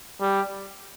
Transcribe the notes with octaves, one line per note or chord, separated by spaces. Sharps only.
G3